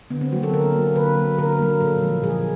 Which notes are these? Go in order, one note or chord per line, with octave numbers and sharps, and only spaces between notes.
D3 B3
C4
F#3 A#3 F#4
A4
D3 A#4
F#3 A#3
D3 B4
F#3 A#3
D3 A#4
F#3 A#3
A#2 A4
F3 G#3
A#2 G#4